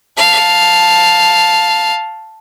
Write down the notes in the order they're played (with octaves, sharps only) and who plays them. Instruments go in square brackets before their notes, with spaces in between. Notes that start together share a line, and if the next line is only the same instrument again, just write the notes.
[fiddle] F5 A5